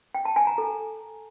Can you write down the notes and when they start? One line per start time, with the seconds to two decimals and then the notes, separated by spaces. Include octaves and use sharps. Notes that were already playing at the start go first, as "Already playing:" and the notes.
0.15 G5
0.25 A5
0.36 G#5
0.47 A#5
0.58 A4